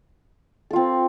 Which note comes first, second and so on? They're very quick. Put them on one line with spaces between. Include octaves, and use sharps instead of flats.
A4 F4 C4